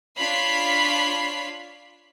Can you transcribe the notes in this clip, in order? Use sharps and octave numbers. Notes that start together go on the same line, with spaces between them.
D4 F4 C#5 B5 B6 C7